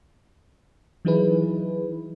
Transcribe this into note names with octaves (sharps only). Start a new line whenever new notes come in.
E3 F#3 D#4 E4 G#4 B4